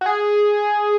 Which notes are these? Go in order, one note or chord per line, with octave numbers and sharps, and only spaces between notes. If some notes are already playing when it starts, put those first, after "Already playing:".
F#4
G#4